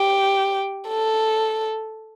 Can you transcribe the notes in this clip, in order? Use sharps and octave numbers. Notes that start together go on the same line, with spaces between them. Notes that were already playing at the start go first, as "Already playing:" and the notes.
Already playing: G4
A4